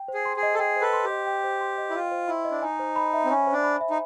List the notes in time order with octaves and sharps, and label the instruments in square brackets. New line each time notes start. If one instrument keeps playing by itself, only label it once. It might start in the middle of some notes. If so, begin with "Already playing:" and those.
Already playing: [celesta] G5
C5
[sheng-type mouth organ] G#4
[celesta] C6
[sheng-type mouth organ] G#4
[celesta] D#5
[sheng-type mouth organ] A4
[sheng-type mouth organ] G#4 [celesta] G5
[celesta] C5
[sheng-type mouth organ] A4 B4
[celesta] C6
[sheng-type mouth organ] G4
[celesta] D#5
G5
C5
C6
D#5
[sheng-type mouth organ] E4
[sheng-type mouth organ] F4 [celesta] G5
[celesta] C5
[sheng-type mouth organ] E4 [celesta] C6
[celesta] D#5
[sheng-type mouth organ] D4
[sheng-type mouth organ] D#4 [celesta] G#5
[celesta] C5
B5
E5
[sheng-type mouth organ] C4
[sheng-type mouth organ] C#4 [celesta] G#5
[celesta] C5
[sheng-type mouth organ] D4
[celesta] B5
E5
[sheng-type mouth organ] D#4